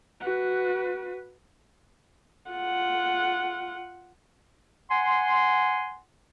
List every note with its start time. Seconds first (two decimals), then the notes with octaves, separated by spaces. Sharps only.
0.20 F#4 B4
2.51 F4 F#5
4.90 F#5 G#5 C6